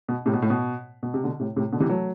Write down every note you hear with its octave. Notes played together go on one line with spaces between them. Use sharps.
B2
A2 C3
B2
A2
B2
B2
C3
B2 D3
A2 C3
A2 C3
B2 D3
C3 E3
F#3 A3